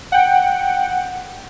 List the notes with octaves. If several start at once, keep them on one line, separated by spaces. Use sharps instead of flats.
F#5 G5